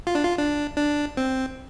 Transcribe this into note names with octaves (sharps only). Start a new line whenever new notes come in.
F4
D4
F4
D4
D4
C4